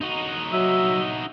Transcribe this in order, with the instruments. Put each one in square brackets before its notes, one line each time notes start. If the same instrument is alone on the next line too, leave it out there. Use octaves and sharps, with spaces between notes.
[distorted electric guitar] D#4 F#4
[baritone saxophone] F#3 [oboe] E5